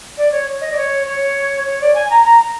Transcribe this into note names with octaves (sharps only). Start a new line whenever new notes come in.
D5
C#5
D#5
D5
C#5
C#5
C#5
D5
G#5
A#5
A#5